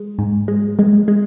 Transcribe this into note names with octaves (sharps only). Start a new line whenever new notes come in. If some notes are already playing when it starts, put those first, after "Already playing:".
Already playing: G#3
G#2
G#3
G#3
G#3